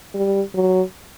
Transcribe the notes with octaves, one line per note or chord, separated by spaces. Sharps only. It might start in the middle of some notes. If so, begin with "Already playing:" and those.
G3
F#3